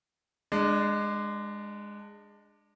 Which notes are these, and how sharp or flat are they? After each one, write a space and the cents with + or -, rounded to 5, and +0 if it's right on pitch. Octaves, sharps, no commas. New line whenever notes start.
G#3 -10 D4 +20